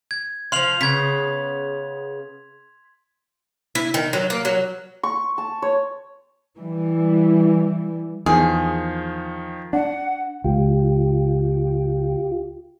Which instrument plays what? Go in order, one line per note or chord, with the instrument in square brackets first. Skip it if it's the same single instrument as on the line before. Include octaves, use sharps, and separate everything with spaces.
[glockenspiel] G#6
[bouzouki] F3 F4 [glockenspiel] C6 F7 F#7
[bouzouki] C#3 B3 [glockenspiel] G#6 B6
[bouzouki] E4
D#3
F#3
A#3
F#3
[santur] C#6
A5
C#5
[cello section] E3 G3
[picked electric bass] E2 [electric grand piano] D#3 F3 [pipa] G#4
[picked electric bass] D4 [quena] F#5
[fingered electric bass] C#2 [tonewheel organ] F4 G4